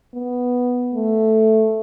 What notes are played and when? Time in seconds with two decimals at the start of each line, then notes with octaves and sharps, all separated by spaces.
0.14 B3
0.94 A3